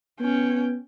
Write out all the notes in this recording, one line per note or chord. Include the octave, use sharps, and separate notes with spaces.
B3 C#4 G5